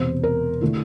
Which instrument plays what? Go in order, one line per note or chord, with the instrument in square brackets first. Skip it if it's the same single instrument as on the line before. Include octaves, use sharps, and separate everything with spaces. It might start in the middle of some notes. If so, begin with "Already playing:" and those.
Already playing: [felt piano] E1 E2 C3 C5
A#4
D3 A3 E4